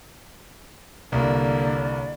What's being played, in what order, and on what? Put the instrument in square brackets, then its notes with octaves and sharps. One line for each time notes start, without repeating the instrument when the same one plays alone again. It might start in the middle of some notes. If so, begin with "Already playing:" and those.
[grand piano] C2 [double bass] D3 A#3 [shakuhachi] D5